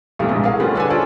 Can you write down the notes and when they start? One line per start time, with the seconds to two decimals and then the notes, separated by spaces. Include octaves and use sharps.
0.19 B1 G2 C3 E3 A3
0.31 A#1 G#2
0.44 G#4 A#4 F5 F#5
0.60 D3 G3 A3 C#4 F4 B4
0.75 D4 A4 B4 G#5
0.90 C#4 F4 A4 B4 C5 D5